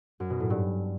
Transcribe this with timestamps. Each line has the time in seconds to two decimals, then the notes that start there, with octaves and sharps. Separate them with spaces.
0.20 F#2
0.30 B2
0.40 A2
0.50 G2